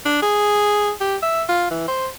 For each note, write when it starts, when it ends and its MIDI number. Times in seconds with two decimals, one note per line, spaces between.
0.05 0.20 62
0.22 0.91 68
1.00 1.16 67
1.22 1.43 76
1.48 1.68 65
1.70 1.84 52
1.88 2.07 72